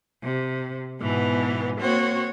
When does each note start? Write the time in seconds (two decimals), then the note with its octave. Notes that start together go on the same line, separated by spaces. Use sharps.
0.22 C3
0.98 G#2 B2 E3 B3
1.79 A#3 C4 F#4 C#5